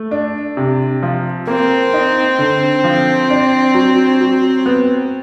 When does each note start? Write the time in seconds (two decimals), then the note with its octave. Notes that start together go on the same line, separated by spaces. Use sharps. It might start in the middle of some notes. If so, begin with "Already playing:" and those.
Already playing: A3
0.11 D4
0.57 C3
1.03 F3
1.47 A#3 C4
1.94 D#4
2.39 D3
2.84 F3
3.30 D4
3.75 F#3
4.21 F#3
4.66 B3